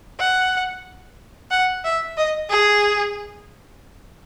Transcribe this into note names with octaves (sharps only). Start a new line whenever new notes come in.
F#5
F#5
E5
D#5
G#4